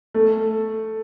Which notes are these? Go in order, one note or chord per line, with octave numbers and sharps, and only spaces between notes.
A3